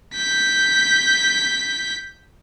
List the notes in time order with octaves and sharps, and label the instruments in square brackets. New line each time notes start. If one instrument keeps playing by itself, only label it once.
[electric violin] G6 B6